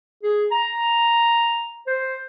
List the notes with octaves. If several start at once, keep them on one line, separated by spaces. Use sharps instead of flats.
G#4
A#5
C5